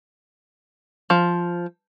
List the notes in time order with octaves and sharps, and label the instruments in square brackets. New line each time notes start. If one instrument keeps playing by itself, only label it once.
[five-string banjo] F3